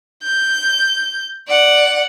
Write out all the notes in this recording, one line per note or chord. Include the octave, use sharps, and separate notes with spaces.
G6
D5 F#5